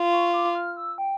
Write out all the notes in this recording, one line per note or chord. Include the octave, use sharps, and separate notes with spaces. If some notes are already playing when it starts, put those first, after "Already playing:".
Already playing: F4
C#6
D6
F6
E6
G5